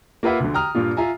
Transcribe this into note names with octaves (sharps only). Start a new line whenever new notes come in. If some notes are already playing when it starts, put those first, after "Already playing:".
A#3 F4 B4 E5 F#5
D2 D3
G5 A#5 D#6 F6
G2 A#2 A#3 F4
F4 E5 G#5 A#5